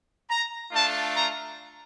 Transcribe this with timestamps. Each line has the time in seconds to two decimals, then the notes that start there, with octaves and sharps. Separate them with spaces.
0.30 A#5
0.72 A3 D4 F4 A5
1.14 A#5